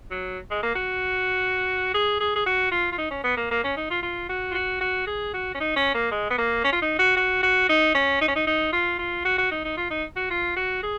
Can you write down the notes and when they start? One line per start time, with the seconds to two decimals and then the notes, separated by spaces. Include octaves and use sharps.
0.11 F#3
0.51 G#3
0.63 A#3
0.75 F#4
1.94 G#4
2.20 G#4
2.36 G#4
2.46 F#4
2.71 F4
2.92 F4
2.98 D#4
3.11 C#4
3.24 B3
3.37 A#3
3.51 A#3
3.64 C#4
3.77 D#4
3.90 F4
4.02 F4
4.29 F#4
4.51 F4
4.54 F#4
4.81 F#4
5.07 G#4
5.34 F#4
5.54 C#4
5.60 D#4
5.76 C#4
5.94 A#3
6.11 G#3
6.30 B3
6.38 A#3
6.64 C#4
6.72 F4
6.82 D#4
6.99 F#4
7.17 F#4
7.43 F#4
7.69 D#4
7.94 C#4
8.21 D#4
8.28 C#4
8.35 D#4
8.47 D#4
8.73 F4
8.99 F4
9.25 F#4
9.38 F#4
9.51 D#4
9.64 D#4
9.77 F4
9.90 D#4
10.16 F#4
10.31 F4
10.56 F#4
10.83 G#4